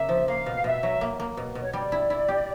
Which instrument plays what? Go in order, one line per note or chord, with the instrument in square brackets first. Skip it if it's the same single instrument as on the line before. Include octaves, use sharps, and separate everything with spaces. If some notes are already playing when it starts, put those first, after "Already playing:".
Already playing: [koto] C#3 A#3 [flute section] E5
[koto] F3
[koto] A#3 [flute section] F5
[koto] B2
[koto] B2 [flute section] E5
[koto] F#3
A#3
A#3
B2
B2
[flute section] C#5
[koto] G3 [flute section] D5
[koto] E4
E4
G4